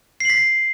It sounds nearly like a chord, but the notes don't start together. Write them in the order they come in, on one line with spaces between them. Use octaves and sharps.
C7 F#7 B6